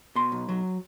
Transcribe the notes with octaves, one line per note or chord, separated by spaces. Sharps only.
B2 C6
B1
F#3